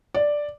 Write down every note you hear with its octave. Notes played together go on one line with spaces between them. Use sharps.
D5